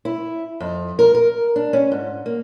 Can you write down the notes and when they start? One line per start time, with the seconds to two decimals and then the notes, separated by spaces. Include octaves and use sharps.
0.05 E4
0.60 F2
0.99 A#4
1.15 A#4
1.56 D4
1.73 C#4
1.92 G#2
2.26 A#3